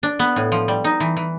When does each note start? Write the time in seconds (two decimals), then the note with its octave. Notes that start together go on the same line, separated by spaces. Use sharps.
0.03 D4
0.19 B3
0.36 A2
0.52 F3
0.68 G3
0.84 D#4
1.00 E3
1.16 E3